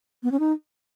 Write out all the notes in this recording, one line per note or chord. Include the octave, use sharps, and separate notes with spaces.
B3
C#4
D#4